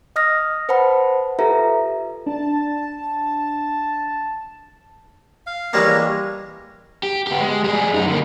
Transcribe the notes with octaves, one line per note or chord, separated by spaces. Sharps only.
D#5 D#6 F6 A#6
B4 C5 F#5 A5 B5
F4 G4 A4 B4 E5 A#5
D4 A5
F5
E3 G3 G#3 A#3 C#5 A#5
G4
B3 G4
G#3
G3 G#4
F#2 D#4
D3 A#3